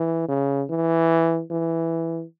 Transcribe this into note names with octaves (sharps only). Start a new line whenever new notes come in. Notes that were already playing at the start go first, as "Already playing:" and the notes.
Already playing: E3
C#3
E3
E3